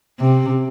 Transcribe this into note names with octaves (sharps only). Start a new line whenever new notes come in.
C3